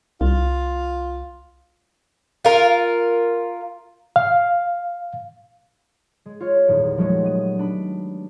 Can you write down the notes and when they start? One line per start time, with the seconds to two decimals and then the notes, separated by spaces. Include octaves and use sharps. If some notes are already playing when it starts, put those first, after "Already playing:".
0.21 C2 F4
2.45 F4 A#4
4.16 F5
6.26 G#3
6.40 F4 C#5
6.68 D#1 E2
6.98 F3 F#3 G#3 A3
7.24 B3 D#7
7.59 D4 B5